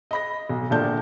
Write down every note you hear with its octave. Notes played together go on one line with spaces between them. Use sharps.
D#5 B5 A#6
B1
A#1 A#2 D3 D4 A5 G6